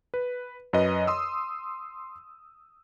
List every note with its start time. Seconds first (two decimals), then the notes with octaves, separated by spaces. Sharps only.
0.14 B4
0.73 F#2 B4 D#5
1.07 C6 D#6 E6